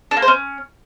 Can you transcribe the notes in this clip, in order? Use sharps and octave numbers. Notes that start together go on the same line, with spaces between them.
D4
A#3
C5
C#4